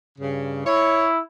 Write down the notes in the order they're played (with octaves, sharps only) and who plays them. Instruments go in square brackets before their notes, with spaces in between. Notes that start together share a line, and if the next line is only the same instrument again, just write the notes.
[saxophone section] G2 C#3
[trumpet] E4 [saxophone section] C#5